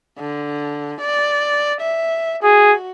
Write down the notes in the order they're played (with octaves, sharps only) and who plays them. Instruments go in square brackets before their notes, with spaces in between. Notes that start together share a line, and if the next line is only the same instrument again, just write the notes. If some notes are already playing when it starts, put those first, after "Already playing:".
[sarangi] D3
D5
E5
[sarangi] F#4 [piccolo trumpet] G#4